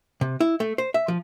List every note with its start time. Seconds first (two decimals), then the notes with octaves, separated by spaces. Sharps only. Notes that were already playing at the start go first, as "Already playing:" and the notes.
0.21 C3
0.40 E4
0.60 A3
0.78 C5
0.94 E5
1.08 F3